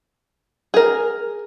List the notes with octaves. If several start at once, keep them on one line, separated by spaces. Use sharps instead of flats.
G#4 A#4